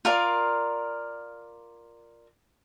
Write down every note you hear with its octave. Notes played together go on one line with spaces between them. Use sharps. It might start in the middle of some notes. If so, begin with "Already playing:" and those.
F4 A#4 D5 F5